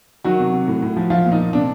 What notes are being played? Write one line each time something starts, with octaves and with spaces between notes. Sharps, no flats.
D#3 F#3 F#4
C3
C3
A2
A2
F3
F3 F4
A#2
D#4
A#2
C3 D4